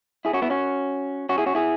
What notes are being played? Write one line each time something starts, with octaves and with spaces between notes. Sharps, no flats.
E4 G#4
C#4 F#4
B3 E4
C#4 F#4
C#4 F#4
E4 G#4
C#4 F#4
E4 G#4